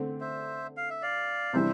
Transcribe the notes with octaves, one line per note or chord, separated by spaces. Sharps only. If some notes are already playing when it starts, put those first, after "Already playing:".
Already playing: D3 A3 C4
C5 E5
F5
E5
D5 F5
C3 E3 G3 D4 C5 E5